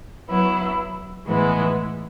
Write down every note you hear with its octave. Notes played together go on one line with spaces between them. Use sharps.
F#3 B3 E4
A2 E3 G#3 B3 E4